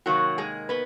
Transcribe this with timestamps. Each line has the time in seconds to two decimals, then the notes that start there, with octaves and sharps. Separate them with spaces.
0.06 C3 D#3 F#3 A#3 F#4
0.38 G#3 G#4
0.69 B3 B4